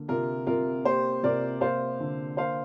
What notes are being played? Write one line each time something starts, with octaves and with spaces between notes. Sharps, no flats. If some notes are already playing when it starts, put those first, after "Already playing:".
Already playing: D3 A#3
C3 F4 A#4
C3 F4 A#4
A#3 G4 C5
C3 A#4 D5
A#3 C5 F5
D3
A#3 C5 F5